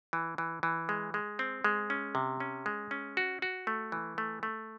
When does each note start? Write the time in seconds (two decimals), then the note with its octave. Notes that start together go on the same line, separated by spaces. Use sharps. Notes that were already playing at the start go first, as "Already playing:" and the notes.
0.13 E3
0.38 E3
0.63 E3
0.89 G#3
1.14 G#3
1.39 C4
1.64 G#3
1.90 C#4
2.15 C3
2.40 C#4
2.66 G#3
2.91 C#4
3.17 F#4
3.42 F#4
3.67 A3
3.92 E3
4.18 A3
4.43 A3